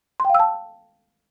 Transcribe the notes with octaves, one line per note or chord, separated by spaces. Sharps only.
F5 G5 A5 C6 E6